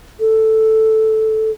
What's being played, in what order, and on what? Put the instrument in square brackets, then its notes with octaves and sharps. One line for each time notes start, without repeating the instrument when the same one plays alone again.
[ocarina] A4